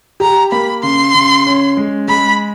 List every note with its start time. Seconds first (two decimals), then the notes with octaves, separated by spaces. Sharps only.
0.20 G4 A#5
0.51 A#3 B5
0.83 C#3 C6
1.15 C#3
1.46 C#4
1.77 G#3
2.08 G#3 B5